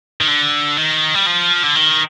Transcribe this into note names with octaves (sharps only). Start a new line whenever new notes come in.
D#3
D3
D#3
G3
F3
D3
D#3